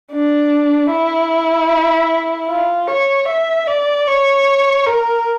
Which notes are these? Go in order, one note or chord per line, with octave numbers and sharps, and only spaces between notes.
D4
E4
F4
C#5
E5
D5
C#5
A#4